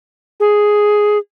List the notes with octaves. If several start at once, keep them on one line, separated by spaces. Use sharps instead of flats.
G#4